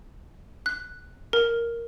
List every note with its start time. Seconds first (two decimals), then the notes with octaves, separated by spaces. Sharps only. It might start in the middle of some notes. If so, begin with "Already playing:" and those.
0.66 F#6
1.33 A#4